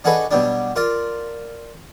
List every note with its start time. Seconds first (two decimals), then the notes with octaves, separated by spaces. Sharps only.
0.04 D4 F#4 G#4 A4 B4 D#5
0.31 B2 F#3 G3 D4
0.76 F4 A#4 D5